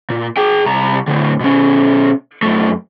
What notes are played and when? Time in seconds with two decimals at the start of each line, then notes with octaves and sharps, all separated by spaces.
0.10 A#2
0.37 G#4 G5
0.66 C2 A#5
1.07 A2 D3
1.40 B2 C#4
2.43 F#2 A3